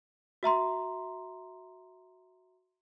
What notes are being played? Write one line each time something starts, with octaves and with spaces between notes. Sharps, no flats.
F#4 E5 A#5 C6